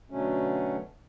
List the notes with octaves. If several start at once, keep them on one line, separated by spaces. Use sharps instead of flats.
B2 D3 F#3 A3 C#4